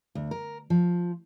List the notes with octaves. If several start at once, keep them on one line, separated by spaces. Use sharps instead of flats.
D2
A#4
F3